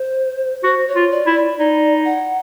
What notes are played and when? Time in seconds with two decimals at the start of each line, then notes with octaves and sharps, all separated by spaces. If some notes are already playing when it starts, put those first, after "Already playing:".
Already playing: C5
0.64 F#4 C5
0.88 C#5
0.96 F4
1.11 D5
1.27 E4
1.35 D5
1.58 D#4 D5
2.05 F#5